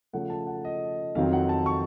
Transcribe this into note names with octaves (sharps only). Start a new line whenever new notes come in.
C#3 F3 A3 C#4 F#5
A5
F#5
D#5
F2 D#3 F#3 C4 F5
F#5
A5
C#6